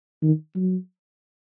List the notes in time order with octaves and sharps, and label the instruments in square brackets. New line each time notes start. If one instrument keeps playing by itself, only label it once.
[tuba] D#3
F#3